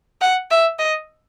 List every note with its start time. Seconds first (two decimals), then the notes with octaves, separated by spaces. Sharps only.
0.21 F#5
0.51 E5
0.79 D#5